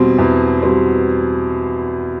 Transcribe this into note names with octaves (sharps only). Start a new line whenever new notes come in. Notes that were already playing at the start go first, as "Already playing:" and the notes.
Already playing: E2 B2 G3 C4
E2
B2 G3 C4